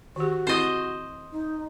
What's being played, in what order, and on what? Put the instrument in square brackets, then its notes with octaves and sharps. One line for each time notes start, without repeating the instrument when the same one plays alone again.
[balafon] D#3 G4 [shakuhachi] F#4
[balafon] C4 E4 [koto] C5 D#5
[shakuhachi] D#4